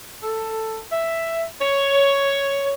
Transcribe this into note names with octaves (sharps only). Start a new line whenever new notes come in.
A4
E5
C#5